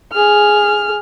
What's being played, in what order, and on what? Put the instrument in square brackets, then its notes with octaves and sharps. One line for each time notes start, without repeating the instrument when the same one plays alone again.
[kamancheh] G#4 F6